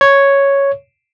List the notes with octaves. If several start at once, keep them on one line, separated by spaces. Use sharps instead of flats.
C#5